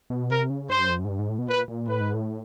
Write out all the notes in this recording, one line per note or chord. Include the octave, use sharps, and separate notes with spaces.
B2
C3 A#4
C#3
G2 C5
F#2
F2
F#2
G#2
G2
G#2
A2
B2
A#2 B4
A#2
A2 B4
G#2
A2